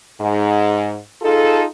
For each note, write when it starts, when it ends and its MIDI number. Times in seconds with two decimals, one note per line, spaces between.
0.19 0.96 44
1.21 1.64 63
1.21 1.64 65
1.21 1.64 68
1.21 1.64 69